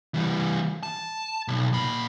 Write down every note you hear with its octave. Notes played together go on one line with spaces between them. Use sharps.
E3 G3
A5
B1
A#2 B5